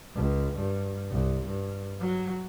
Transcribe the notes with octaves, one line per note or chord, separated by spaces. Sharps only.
C#2
G2
C2
G2
F#3